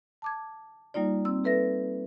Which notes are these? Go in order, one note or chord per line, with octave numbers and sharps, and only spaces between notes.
A5 D6 G#6
G3 A#3 D#4 F4 D5
C4 E6
A4 B4 E5 A#6